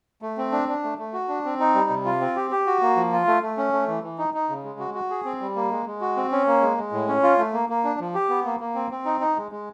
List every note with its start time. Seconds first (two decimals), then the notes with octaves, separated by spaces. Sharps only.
0.22 A3
0.37 C4
0.52 D4
0.68 D4
0.84 A3
0.98 A3
1.13 F#4
1.28 D4
1.45 C4
1.60 D#4
1.75 G3
1.90 C3
2.05 F4
2.21 C4
2.36 G4
2.51 G4
2.66 F#4
2.81 A#3
2.96 F3
3.12 F4
3.27 A3
3.42 A3
3.57 C#4
3.73 A3
3.88 E3
4.03 E3
4.18 D#4
4.34 D#4
4.49 C#3
4.65 G#3
4.79 F#4
4.94 F#4
5.10 G#4
5.25 C4
5.41 G3
5.56 A#3
5.71 G#3
5.86 G#3
6.01 F#4
6.17 C4
6.32 C#4
6.47 A#3
6.62 G#3
6.77 G#3
6.92 A2
7.08 C#4
7.23 F4
7.38 A3
7.53 A#3
7.69 A#3
7.84 D4
8.00 F3
8.14 G4
8.29 B3
8.45 A#3
8.60 A#3
8.75 C4
8.91 C4
9.05 D#4
9.21 D#4
9.36 G#3
9.52 G#3